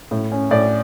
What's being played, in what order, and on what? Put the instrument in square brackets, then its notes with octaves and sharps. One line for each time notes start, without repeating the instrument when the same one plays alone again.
[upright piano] A2
C#4
A2 D5